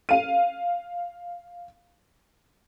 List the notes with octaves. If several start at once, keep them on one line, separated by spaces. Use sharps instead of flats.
F5 D#7